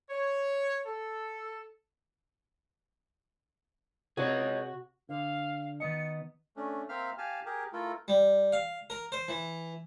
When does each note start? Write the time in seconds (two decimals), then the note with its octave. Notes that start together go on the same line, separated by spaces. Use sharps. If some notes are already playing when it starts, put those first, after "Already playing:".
0.10 C#5
0.86 A4
4.17 C3 F#4 G#4 C#5 D#5
5.09 D3 F5
5.80 D#3 B3 D#5 C#7
6.57 A3 C#4 D4
6.89 A#3 C4 C5 E5 F5 F6
7.18 G4 F5 G#5 A5 F6
7.46 G4 G#4 A#4
7.73 A3 E4 F4 A4 A#4
8.08 G3
8.52 F5
8.90 A#4
9.12 C5
9.28 E3